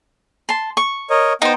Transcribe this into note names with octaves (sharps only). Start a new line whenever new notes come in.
A5 C6
C#6
A#4 C#5 D#5
B3 D#4 C5 G5